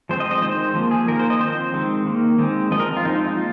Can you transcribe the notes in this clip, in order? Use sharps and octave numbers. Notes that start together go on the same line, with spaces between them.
F3 G#3 C4 C5
D#5
D#5
D#3 G#3 C4 C5
F3 A#3
G#4
D#3 A#3 A#4
C5
D#5
F3 C4 C5
D#3 G#3 C4
D#3 A#3
D#3 G#3 C4
F3 C4 D#5
A#4
F4
F3 G#3 C4 D#4
D#4
A#3 F4